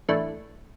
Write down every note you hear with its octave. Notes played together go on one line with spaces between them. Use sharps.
A2 E3 A3 D4